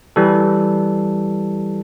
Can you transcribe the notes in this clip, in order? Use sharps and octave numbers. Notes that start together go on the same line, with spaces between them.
E3 G3 A4